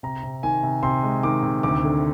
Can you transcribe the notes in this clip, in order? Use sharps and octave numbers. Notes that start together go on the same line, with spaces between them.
C3 A#5
C3
D#3 G#5
C3
C3 C6
G#3
D#3 D6
C3
D2 D6
D3